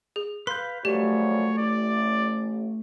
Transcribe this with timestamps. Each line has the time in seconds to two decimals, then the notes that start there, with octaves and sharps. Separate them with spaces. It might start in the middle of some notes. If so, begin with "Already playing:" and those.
0.16 G#4
0.47 B4 F5 C6 G6
0.85 F#2 F3 G3 A3 G4 C#5
1.58 A1 D5